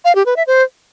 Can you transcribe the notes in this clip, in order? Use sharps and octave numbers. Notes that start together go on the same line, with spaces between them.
F5
G4
B4
E5
C5